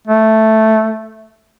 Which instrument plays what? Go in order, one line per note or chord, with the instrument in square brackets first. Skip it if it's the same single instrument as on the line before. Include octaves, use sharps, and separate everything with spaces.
[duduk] A3